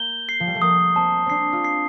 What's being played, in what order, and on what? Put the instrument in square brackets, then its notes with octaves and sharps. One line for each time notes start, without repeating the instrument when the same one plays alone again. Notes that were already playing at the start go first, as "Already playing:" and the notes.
Already playing: [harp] A#3 [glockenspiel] G6 G7
[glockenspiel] C7
[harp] F3
G3
A3
[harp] A#3 [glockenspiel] D#6
[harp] C4 [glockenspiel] A5
[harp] C4 D4 [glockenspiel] C7
[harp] F4
[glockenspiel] C7